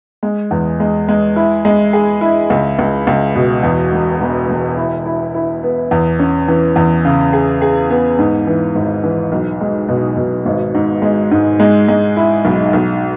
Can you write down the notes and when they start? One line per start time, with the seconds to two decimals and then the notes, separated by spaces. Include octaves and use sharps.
0.23 G#3
0.51 E2
0.80 G#3
1.08 G#3
1.36 E4
1.65 G#3
1.93 G#4
2.21 E4
2.50 C#2
2.79 C#2
3.07 C#2
3.35 B2
3.63 E2
3.92 E1
4.21 E1
4.50 E1
4.77 E4
5.06 E4
5.34 E4
5.63 B3
5.91 E2
6.19 C#4
6.48 E3
6.76 E2
7.05 C#3
7.33 G#4
7.62 G#4
7.90 B3
8.19 G#2
8.47 E3
8.75 G#1
9.04 E3
9.32 B1
9.61 G#3
9.89 B2
10.17 B2
10.45 G#1
10.75 G#2
11.02 G#3
11.31 G#2
11.60 G#3
11.88 G#3
12.17 E4
12.45 B1
12.73 B1